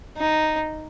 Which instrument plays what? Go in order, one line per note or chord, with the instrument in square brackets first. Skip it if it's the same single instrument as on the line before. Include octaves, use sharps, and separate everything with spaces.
[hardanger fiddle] D#4